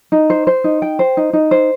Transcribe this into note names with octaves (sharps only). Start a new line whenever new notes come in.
D#4
C5
C5
D#4
G5
C5
D#4
D#4
C5